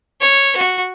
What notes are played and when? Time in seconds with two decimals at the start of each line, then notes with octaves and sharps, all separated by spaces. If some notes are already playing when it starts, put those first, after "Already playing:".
0.21 C#5
0.56 F#4